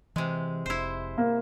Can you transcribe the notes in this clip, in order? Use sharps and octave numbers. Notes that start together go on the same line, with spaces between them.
C3 E3 G#3
F1 E4 C5
A#3